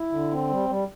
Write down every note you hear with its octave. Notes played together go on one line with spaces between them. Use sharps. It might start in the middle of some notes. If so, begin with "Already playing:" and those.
Already playing: E4
D3
C4
G3
G3